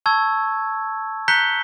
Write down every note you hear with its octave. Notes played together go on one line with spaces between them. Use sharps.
A5 C#6 E6 G#6
A#5 F#6 G6 B6 C#7 G7